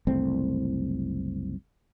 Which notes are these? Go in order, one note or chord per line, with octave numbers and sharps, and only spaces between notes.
F#1 C2 A3 C4